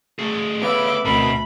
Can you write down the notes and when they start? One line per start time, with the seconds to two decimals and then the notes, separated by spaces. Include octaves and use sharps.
0.19 A3 G#4
0.62 A3 B3 B4 C#5 E5 F5 B5 D6
1.05 D2 B2 C4 A#4 B5